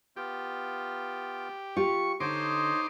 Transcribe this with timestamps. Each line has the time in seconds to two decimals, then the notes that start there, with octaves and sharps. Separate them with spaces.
0.16 B3 F4 G4
1.76 F4 G4 C#6
2.20 D3 D#4 C5 C#5 D#5 C6 D6